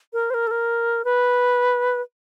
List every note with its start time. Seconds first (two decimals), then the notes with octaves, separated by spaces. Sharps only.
0.13 A#4
0.30 C5
0.34 A#4
0.47 A4
0.51 A#4
1.05 B4